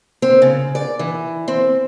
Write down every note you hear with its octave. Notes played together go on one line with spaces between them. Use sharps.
C4
C#3
D5
E3
C4